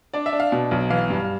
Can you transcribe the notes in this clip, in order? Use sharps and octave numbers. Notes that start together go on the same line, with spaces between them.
D4 D5
E5
D4
F5
B2
B1
E3 F5
G2